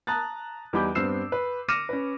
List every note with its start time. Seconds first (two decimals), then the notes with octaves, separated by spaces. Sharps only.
0.07 A5 A#5 D#6 F#6 A6
0.73 E2 G3 D#4 B5 D6 G6
0.95 G2 B3 C4 E6 C7 E7
1.32 B4
1.69 D6 F6 A#6 C#7 D#7 E7
1.89 C#4 B4